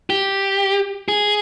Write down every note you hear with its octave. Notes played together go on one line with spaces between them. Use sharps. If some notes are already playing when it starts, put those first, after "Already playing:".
G4
G#4